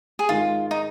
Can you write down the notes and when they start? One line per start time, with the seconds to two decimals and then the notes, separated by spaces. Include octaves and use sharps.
0.19 G#4
0.29 G#2 D#3 G#3 F4
0.71 D#4